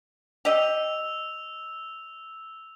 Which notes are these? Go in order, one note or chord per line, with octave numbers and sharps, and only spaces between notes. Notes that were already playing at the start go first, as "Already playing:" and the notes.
G4 D#5 E6 F7